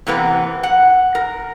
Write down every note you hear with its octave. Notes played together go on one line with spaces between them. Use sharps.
C3 E3 A#3 B3
F#5
A#4